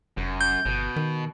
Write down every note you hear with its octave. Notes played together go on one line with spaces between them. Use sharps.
F1 F#2
G6
G1 B2
D#3